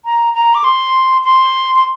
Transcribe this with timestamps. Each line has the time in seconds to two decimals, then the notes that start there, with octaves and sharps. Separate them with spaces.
0.05 A#5
0.34 A#5
0.55 D6
0.64 C6
1.24 C6
1.76 C6